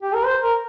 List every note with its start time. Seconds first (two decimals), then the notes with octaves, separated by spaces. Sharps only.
0.03 G4
0.14 A#4
0.25 C5
0.42 A#4